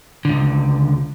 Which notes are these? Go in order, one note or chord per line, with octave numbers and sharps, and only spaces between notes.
C#2 D3